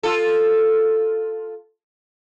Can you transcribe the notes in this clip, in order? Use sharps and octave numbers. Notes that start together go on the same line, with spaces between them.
F4 A4